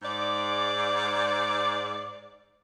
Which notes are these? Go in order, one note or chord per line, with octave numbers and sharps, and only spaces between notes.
G#2 D5